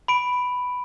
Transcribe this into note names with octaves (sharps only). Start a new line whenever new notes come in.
B5 D7